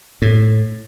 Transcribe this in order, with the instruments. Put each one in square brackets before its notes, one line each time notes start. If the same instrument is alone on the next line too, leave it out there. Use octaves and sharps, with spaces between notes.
[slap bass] A2